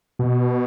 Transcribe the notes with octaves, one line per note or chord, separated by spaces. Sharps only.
B2